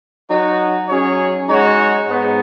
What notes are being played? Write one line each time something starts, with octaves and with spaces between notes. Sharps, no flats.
F#3 D#4 F#4 C#5
F#3 C#4 G#4 C#5
G#3 D#4 F#4 C#5
G#2 G#3 B3 D#4